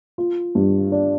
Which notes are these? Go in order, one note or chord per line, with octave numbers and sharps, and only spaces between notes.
F4
G2
D4